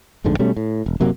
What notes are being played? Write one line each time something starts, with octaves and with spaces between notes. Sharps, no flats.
A1 F2 G#2 D3
B2 G3 A3 C#4
A2
E1
F#1 C3 F#3 A#3